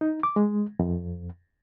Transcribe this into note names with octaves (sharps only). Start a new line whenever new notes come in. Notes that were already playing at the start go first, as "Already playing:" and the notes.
D#4
D6
G#3
F2